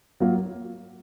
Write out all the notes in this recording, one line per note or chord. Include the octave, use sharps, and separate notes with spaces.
F#3 A#3 F4